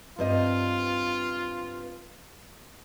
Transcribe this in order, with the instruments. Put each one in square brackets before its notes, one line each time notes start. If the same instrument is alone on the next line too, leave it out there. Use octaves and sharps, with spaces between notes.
[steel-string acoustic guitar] G2 C4 D#5 [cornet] F4